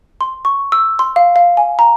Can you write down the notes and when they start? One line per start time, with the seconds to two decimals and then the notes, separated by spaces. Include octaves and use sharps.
0.21 C6
0.45 C#6
0.72 E6
0.99 C6
1.16 F5
1.36 F5
1.57 G#5
1.79 A#5